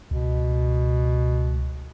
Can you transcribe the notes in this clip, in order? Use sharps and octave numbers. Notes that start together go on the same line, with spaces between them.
C#2 B2